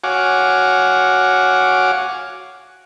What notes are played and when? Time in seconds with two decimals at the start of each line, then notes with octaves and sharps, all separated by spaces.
0.04 F#4 C#5 F5 F#5 G#5 D6